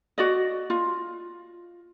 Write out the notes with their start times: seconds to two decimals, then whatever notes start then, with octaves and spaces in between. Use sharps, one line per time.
0.18 F#4 D5 D#5
0.70 F4